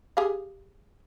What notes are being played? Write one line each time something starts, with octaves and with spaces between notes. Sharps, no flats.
G4 G#4 F5